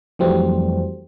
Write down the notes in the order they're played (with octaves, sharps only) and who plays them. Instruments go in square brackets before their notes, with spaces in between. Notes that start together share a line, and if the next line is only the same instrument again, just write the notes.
[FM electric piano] F2 E3 F#3 G3 A3 C4